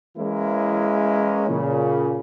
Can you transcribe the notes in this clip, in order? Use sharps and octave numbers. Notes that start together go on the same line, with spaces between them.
E3 G#3 A#3 C#4 E4
A#2 C#3